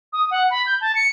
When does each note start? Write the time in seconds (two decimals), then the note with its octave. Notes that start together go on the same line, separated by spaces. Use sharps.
0.13 D#6
0.31 F#5
0.50 B5
0.66 G6
0.81 A5
0.95 C#7